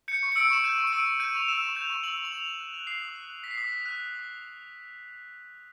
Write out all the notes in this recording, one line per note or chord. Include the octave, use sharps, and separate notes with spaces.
G6 C#7
C#6
C#7
E6 D7
C#6 E7
G6 D#7
C#6
D#7
E6 D7
C#6
G6 D#7
C#6 F7
E6 E7
C#6
G6 F7
C#6
E6 F#7
C#6
F#7
D#6 F7
D#6
F#6
F#6
D#6 C7
D#6
F#6
F#6
D#6 B6
C7
D#6 B6
F#6
F#6
D#6
D#6